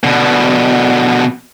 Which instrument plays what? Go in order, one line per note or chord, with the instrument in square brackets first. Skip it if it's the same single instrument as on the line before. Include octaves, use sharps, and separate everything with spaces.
[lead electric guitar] B2 D3